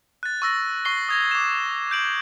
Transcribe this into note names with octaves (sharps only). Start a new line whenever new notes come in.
F#6 A6
C#6 E6 A#6
C#6 C7 G7
D#6 G#6 A#6
D6 E7
G6 D7 F#7